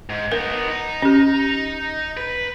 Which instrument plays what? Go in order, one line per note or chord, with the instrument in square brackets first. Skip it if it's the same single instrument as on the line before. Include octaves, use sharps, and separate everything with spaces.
[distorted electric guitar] G#2
[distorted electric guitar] B3 D#4 [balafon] A#4
[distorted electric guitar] D#4
[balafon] C#4 G4
[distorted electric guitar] B4